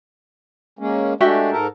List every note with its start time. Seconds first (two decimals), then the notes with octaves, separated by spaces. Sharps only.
0.79 G#3 A#3 C#4
1.20 G#3 A3 D4 F#4 G4 E5
1.51 G#2 A4 A#4